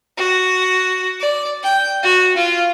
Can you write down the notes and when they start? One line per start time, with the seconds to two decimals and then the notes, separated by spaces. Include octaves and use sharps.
0.17 F#4
1.20 D5
1.63 G5
2.03 F#4
2.37 F4